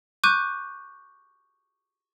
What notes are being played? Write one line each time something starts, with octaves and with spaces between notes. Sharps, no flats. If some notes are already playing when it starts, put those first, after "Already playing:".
C#6 D6 F#6 G6 D#7